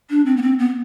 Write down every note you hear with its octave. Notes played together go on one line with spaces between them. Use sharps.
D4
C4
B3
C4
B3